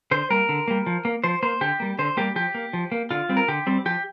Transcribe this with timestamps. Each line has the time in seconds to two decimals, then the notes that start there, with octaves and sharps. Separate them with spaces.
0.11 D3 C5
0.30 G3 A#3 A#4
0.49 D3
0.68 G3 A#3
0.86 F3
1.05 A#3
1.24 F3 C5
1.43 A#3 C5
1.61 D3 G4
1.80 G3 A#3
1.99 D3 C5
2.17 G3 A#3 G4
2.36 F3 G4
2.54 A#3
2.73 F3
2.92 A#3
3.11 D3 F4
3.29 G3 C4
3.37 A#4
3.48 D3 G4
3.67 G3 C4
3.86 F3 G4